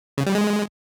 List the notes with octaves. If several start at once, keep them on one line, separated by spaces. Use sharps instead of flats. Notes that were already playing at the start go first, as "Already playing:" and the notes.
C#3
G3
G#3